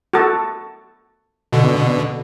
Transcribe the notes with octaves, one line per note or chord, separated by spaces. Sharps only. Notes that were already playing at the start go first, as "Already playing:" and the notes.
F#4 A4
B2 D3